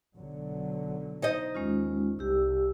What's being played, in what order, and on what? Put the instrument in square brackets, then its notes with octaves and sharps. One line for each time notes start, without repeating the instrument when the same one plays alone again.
[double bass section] B1 D3 F#3
[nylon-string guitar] D#4 C5 D#5
[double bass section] D#2 [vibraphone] G#3 C#4 F4
[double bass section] C2 [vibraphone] G4 E6